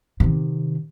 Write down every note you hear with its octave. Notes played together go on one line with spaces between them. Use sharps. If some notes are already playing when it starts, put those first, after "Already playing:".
C3 D#3